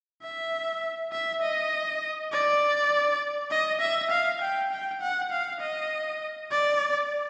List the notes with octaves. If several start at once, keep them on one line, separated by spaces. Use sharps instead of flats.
E5
E5
D#5
D5
D#5
E5
F5
G5
G5
F#5
F5
D#5
D5